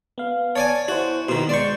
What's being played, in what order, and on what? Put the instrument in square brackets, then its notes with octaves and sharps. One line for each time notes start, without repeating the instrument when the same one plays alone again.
[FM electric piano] B3 F5
[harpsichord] C#5 D5 G#5 [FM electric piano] A5
[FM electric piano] E4 C5 [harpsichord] F#4
[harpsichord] B2 D#3 [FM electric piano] C6
[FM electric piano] G#3 C6 G6 [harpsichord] D5 C#6